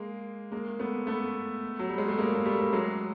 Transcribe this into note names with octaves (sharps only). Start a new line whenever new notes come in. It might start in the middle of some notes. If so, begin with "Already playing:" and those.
Already playing: G#3 A#3
G#3 A#3
A3 B3
A3 B3
F#3
G3
G#3
A3
G#3 A#3
A#3
G3 A3
G3
F#3 G#3